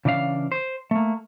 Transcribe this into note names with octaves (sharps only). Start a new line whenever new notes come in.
C#3 E3 D4 D5 F5
C5
A3 A#3